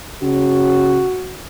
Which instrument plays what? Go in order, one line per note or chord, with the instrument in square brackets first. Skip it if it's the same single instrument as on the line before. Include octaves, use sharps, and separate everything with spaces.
[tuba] C#3 [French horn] F#4